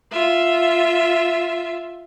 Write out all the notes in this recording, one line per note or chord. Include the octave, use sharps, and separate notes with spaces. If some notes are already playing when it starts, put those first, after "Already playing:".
F4 E5